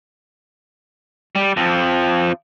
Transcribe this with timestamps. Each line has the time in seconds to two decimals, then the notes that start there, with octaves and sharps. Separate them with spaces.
1.35 G3
1.57 F2 F3